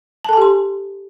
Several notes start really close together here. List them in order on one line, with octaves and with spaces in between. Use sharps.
A5 A4 G#5 G4 C6